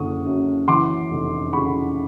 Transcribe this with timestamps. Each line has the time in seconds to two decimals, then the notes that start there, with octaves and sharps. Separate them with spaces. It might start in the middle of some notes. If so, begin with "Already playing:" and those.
Already playing: F#1 D3 C#6 D#6
0.26 F#2
0.68 E3 C6 D6
1.11 F1
1.53 C#3 B5 C#6